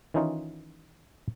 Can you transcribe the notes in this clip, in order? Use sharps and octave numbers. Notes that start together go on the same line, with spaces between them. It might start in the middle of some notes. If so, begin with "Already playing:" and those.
D#3 E3 C#4 D#4 F4